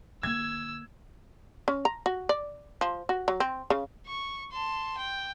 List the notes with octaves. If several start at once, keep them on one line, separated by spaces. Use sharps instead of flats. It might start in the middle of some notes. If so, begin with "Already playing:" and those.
D3 A#3 E6 G#6
C#4
A#5
F#4
D5
F3
F#4
F#3
C4
C#3
C#6
A5 C6
G5